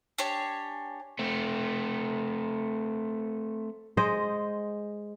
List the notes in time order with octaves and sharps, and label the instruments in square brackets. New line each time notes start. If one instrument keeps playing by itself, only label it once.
[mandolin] D4 G4 C#5 G#5
[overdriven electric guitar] A3 C4
[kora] G#3 C5 D#5